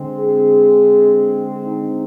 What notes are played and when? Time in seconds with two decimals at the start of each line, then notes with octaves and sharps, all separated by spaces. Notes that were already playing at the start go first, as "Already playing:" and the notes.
Already playing: D3 G#3 C4
0.19 G#4
1.64 D#4